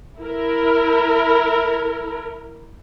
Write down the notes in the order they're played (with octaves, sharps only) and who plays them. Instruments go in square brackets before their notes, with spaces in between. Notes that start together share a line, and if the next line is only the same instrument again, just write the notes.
[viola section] E4 A#4